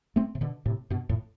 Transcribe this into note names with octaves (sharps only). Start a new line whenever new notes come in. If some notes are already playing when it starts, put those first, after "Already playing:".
A3 C4
C3
B2 D3
A2 C3
G2 B2
F2 A2